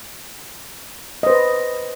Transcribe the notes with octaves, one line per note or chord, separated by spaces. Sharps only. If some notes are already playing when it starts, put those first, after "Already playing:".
B4 C5 D#5